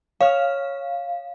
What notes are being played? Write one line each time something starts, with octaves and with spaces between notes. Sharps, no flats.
C#5 F5 F6